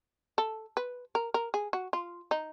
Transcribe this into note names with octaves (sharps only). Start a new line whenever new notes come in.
A4
B4
A#4
A#4
G#4
F#4
F4
D#4